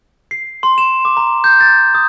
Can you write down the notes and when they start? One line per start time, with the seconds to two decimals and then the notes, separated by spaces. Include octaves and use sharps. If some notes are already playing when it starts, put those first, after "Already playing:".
0.31 C7
0.63 C6
0.78 E7
1.05 D6
1.17 A#5
1.44 G6
1.61 A6
1.95 D#6